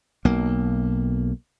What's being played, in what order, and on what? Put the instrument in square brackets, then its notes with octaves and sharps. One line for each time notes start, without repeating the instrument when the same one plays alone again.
[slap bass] B1 A#3